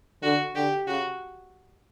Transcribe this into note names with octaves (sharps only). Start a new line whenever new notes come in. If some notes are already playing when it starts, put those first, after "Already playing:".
D3 F#4
D3 G4
C#3 F#4